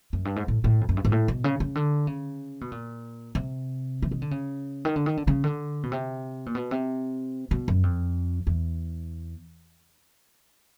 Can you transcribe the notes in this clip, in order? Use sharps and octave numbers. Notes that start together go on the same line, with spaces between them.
F#2
G2
G#2
A2
A2
F2
F#2
G2
G#2
A2
B2
C#3
C#3
D3
C#3
B2
A#2
C3
E3
D#3
D3
C#3
D#3
D3
D#3
D3
C#3
D3
B2
C3
A#2
B2
C3
B2
F#2
F2
E2